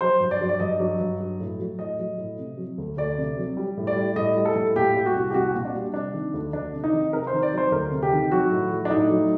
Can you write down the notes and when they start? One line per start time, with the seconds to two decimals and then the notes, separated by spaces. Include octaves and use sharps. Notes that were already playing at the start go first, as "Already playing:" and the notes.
0.01 F#3 C5
0.20 G2
0.31 D5
0.41 F#3
0.49 D5
0.60 G2 D#5
0.80 F#3
1.00 G2
1.20 F#3
1.40 A2
1.60 F#3
1.78 A2 D#5
1.99 F#3
2.18 A2
2.39 C3
2.58 F#3
2.78 D2
2.97 D2 D5
3.18 C3
3.38 F#3
3.57 G3
3.77 A2
3.87 D5
3.96 G3
4.16 A2 D#5
4.36 G3
4.45 A4
4.56 A2
4.75 A#2 G4
4.96 G3
5.06 F#4
5.15 C2
5.31 G4
5.34 C2 F#4
5.54 A#2
5.65 D4
5.75 G3
5.94 C3 D4
6.14 D#3
6.34 D2
6.53 D2 D4
6.73 C3
6.84 D#4
6.93 D#3
7.13 C3 A#4
7.27 C5
7.33 D#3
7.43 D5
7.52 F#3
7.58 C5
7.72 D2 A#4
7.91 C3
8.02 G4
8.12 D#3
8.32 F#3 F#4
8.52 A2
8.71 F#3
8.85 D4
8.90 A2 D#4
9.10 F#3